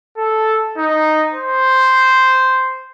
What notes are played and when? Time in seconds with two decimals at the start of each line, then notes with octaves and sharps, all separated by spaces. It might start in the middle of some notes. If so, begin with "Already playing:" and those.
0.18 A4
0.77 D#4
1.33 C5